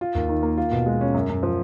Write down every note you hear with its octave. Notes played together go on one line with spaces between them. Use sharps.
F4
D#2
D#3
A#3
F4
B2
G#3
C#4
F#2
F#2
F3